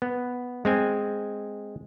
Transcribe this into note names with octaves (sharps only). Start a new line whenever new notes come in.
B3
G#3 C4 G#5